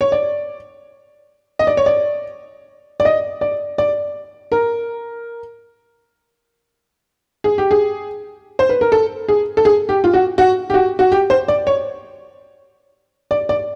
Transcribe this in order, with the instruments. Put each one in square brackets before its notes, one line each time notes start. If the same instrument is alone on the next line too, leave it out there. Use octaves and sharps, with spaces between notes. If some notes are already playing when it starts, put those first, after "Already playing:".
[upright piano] C#5
D5
D#5
D5
C#5
D5
D5
D#5
D5
D5
A#4
G#4
G4
G#4
C5
B4
A#4
A4
G#4
A4
G#4
G4
F4
F#4
F#4
G4
F#4
F#4
G4
C5
D5
C#5
D5
D5